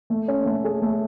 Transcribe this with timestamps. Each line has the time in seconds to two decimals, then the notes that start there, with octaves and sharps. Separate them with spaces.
0.10 A3
0.28 C#4
0.46 A3
0.64 G#4
0.82 A3